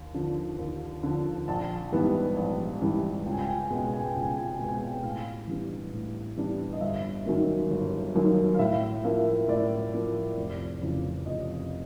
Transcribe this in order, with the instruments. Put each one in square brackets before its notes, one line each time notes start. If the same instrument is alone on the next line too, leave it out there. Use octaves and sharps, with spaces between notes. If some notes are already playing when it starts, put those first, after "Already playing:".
Already playing: [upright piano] D#2
D3 F3
D#2
D3 F3
A#1 A5
G#2 E3 G3 B3
A#1
G#2 E3 G3 B3
C#2 G5
G#5
G5
G#5
G5
G#5
B2 G#3 B3 G5
G#5
G5
G#5
G5
G#5
C#2 G5
G#5
G5
G#5
G5
G#5
B2 G#3 B3 G5
G#5
G5
G#5
G5
A2 F5
E3 G3 B3 D4
A2
E3 G3 B3 D4
D#5
G1 E5
F#2 D#3 F#3 A#3
G1
F#2 D#3 F#3 A#3
F5
A2 E5
F3 A#3 E5
A2 D5
F3 A#3
F1
F2 C#3 E3
F1 D#5